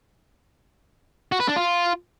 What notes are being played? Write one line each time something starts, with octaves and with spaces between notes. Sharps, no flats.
F#4
B4
D4
F4